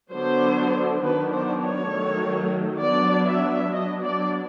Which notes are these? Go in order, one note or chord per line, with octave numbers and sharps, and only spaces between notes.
D3 F#3 B3 D4 C5
D#3 F#3 B3 D4 B4
C5
C#5
D#3 F#3 A3
F#3 B3 D4 D5
E5
F#3 B3 D4 D#5
D5